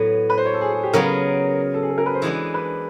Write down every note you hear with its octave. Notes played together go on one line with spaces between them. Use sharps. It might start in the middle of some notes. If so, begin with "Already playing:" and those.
Already playing: A2 F#3 B3 B4
B4
C5
C#5
A4
G#4
G#4
G4
C#3 F#3 B3 A#4
A4
G#4
A4
A#4
B4
C5
E3 G#3 B3 D4
B4